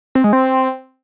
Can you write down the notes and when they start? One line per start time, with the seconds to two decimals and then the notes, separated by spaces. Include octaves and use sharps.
0.15 C4
0.24 G#3
0.33 C4